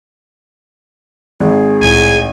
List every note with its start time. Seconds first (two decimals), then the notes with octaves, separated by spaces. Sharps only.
1.40 G#1 G#4
1.82 C2 A2 G#5